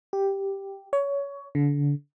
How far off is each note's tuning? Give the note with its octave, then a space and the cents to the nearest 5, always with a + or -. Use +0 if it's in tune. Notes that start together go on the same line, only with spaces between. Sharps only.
G4 +0
C#5 +20
D3 -30